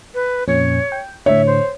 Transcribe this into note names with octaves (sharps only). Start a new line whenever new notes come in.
B4
F2 A#2 C#4 C#5
G5
A2 D3 C#5 E5
C5